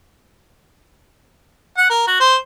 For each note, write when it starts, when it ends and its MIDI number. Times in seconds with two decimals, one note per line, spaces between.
1.78 1.87 78
1.90 2.05 70
2.07 2.18 66
2.20 2.36 72